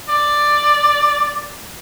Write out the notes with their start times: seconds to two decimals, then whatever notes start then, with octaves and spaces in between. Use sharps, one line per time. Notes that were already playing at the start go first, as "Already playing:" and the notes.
0.09 D5